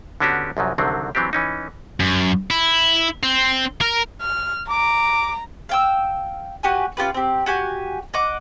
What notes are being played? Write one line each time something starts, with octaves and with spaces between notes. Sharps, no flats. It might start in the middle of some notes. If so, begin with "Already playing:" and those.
D3 B3 C#4 D4 F#4 G4
C2 F#2 F3 F#3
C2 D3 D#3 F#3 C4
E3 F#3 C4 D4 G4
E3 C#4 D#4
F#2
E4
C4
A#4
F6
A#5 D6
F5 G5 E6
F#4 G4 B4 G#5
C#4 F4 G4 B4
C4 G4
F#4 G4 G#5
D#5 F#5 D6